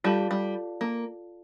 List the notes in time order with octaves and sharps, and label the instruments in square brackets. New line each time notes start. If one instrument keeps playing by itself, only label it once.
[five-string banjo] G3 [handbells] F4 A4 D5 F5 A5
[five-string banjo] G3
A#3